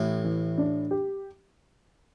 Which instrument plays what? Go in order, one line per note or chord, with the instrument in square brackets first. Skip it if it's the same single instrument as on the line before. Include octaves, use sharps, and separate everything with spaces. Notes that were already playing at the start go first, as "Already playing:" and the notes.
Already playing: [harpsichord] A1 A2 [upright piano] A3
[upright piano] E3
D4
G4